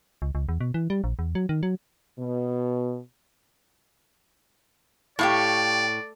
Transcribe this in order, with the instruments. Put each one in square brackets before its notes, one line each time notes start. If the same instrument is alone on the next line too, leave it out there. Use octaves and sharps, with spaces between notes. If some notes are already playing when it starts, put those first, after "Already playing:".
[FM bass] C#2
C#2
E2
B2
E3
G3
A#1
E2
F#3
D#3
F#3
[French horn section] B2
[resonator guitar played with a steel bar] A2 [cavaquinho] G4 F5 C#6 [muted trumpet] D5